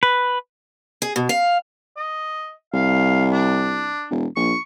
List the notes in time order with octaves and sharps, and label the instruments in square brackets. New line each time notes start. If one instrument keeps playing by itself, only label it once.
[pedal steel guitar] B4
[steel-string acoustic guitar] G#4
B2
F5
[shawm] D#5
[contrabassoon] C2 [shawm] F5
[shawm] D4
[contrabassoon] E1
[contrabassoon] A#1 [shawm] C#6